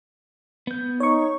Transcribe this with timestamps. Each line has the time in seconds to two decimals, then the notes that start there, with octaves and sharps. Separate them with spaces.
0.67 B3 G6
1.00 D#4 C#5 C#6